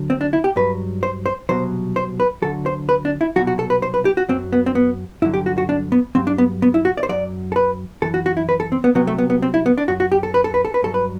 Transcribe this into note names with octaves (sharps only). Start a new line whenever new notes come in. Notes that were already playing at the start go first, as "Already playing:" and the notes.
Already playing: D2 D3 F#3
C4
D4
E4
G4
G2 F#3 B4
C5
C5
C2 B2 F#3 C5
C5
B4
D2 D3 F#3 A4
C5
B4
D4
E4
C2 B2 F#3 F#4
F#4
A4
B4
C5
B4
G4
F#4
F#2 F#3 C4
B3
C4
B3
G2 D3 F#3 E4
G4
F#4
F#4
D4
B3
G2 F#3 C4
D4
B3
B3
E4
F#4
D5
C5
F#2 F#3 D5
A4
B4
F#2 E3 A4
F#4
F#4
E4
B4
A4
C4
B3
C2 C3 F#3 B3
A3
B3
B3
C4
E4
B3
D4
F#2 F#3 F#4
F#4
G4
A4
B4
A4
B4
A4
B4
G2 F#3 A4
B4